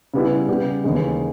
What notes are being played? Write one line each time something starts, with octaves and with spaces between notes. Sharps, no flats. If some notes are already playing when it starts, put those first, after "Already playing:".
C#3 G3 B3 E4
C#3 G3 B3 G4
D#2 C#3 E3 G#3